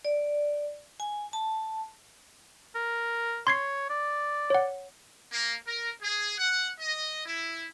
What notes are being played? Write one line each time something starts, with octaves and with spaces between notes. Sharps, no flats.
D5
G#5
A5
A#4
C#5 C6 G#6 C7
D5
C#5 F#5
A#3
A#4
G#4
F#5
D#5
E4